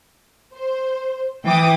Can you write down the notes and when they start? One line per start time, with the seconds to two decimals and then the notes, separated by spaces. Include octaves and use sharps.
0.55 C5
1.45 E3 G5 D6 D#6